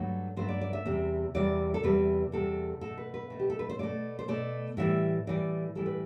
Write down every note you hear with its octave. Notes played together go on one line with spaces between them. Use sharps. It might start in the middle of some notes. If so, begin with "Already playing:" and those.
Already playing: G2 F#3 A3
G2 F#3 A3 C5
D5
D5
E5
E2 C3 G3
E2 C3 G3 D5
A4
E2 C3 G3 B4
E2 C3 G3 A4
B2 A3 A4
B4
B4
B2 A3
G4
A4
B4
C5
B2 A3 D5
C5
B2 A3 D5
A2 E3 G3 E5
A2 E3 G3 D5
A2 E3 G3 A4
B4